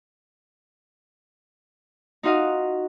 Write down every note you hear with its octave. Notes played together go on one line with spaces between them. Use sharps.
D#4 F4 F#4 D#5 F5